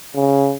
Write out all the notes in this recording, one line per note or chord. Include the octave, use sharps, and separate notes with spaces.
C#3